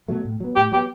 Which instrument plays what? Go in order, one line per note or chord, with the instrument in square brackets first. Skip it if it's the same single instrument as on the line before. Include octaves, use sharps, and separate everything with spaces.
[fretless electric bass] B2 F#3 A3
A2
F#3 B3
[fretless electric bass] A2 [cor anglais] G4
[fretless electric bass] F#3 B3 [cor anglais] G4